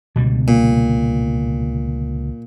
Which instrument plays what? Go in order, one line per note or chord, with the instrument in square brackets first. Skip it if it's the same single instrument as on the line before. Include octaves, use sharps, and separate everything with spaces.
[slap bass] C#2 D3 G3 [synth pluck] B2
[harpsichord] A#2